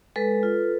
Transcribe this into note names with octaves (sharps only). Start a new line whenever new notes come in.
G#3 A4 B4
F4